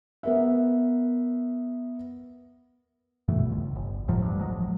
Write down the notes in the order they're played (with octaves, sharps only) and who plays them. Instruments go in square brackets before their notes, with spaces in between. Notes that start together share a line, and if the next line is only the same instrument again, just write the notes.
[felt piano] B3 A#4 E5
[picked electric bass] G2 B2 E3 A3
C#2
G1
D#2 A2 F3 F#3
G2
A1 F3 F#3 G#3